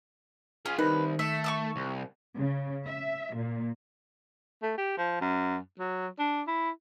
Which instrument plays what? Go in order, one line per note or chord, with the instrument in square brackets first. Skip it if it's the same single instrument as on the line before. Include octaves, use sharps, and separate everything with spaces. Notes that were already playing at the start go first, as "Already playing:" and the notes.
[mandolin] C#4 [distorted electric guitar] F4 G#4
[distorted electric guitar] C2 [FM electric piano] D#3 [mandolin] B4
[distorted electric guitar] A3 [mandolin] E5
[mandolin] C#6 D6 E6
[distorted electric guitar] C2
[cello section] C#3
E5
A#2
[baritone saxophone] A3
G4
F3
F#2
F#3
D4
E4